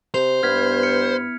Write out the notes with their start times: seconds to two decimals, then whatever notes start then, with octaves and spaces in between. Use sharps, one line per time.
0.14 C3 C5 F7
0.43 G2 B3 E4 F6 G#6 B6
0.83 F6 C#7